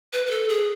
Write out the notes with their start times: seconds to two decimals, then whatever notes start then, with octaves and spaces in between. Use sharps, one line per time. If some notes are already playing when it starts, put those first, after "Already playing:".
0.13 B4
0.26 B4
0.31 A4
0.49 G#4